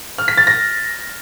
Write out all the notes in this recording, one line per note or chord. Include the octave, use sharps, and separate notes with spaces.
F6
B6
A6
A#6